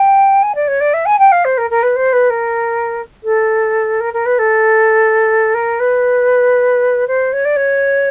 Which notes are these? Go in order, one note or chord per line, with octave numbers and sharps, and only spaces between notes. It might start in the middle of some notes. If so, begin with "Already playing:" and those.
Already playing: G5
G#5
D5
C#5
D5
E5
G#5
G5
F5
C5
A#4
A#4
B4
C5
B4
A#4
A4
A#4
A#4
B4
A4
A#4
B4
C5
C#5
D5
C#5